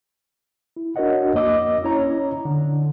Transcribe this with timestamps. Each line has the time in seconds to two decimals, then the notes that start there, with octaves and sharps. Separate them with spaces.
0.76 E4
0.96 D4 F#4 A#4 C#5 D#5 F#5
1.34 F2 A#3 D#5 D6 E6
1.83 C#4 E4 C#5 A#5
2.45 D3